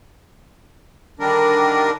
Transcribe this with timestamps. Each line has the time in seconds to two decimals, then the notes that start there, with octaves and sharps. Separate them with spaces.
1.19 D3 D#3 G3 D4 A#4